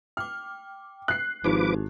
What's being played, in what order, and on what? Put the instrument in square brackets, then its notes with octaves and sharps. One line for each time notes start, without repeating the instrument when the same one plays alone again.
[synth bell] G5 D6 [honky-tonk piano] F6
[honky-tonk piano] F#6 C7
[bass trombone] G#1 [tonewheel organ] F3 B4 D6 [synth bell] D#4 E4 G4